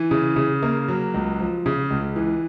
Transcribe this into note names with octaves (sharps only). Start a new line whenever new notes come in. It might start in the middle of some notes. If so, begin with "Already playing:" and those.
Already playing: E3
C#3
C#3
A#3
F#3
C#2
F3
C#3
C#2
E3